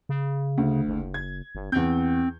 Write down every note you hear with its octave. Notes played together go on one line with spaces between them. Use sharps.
C#3
D2
F#1
G#6
G1
E2 C4 G6